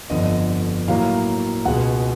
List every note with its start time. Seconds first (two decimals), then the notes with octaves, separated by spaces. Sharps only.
0.10 G1 F2 D3 D#5
0.88 A2 F#3 A#3 F5
1.65 C#2 B2 G#3 F#5